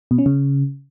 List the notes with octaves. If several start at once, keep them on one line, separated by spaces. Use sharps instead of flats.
B2
C#4
C#3